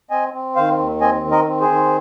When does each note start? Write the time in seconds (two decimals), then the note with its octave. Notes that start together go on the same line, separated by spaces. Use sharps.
0.11 C4 D#5 G#5
0.34 C4
0.56 D#3 C5 F5
0.78 D#2
1.01 C4 D#5 G#5
1.24 D#3
1.31 A#4 D#5
1.47 C4
1.61 G#4 C5
1.69 D#3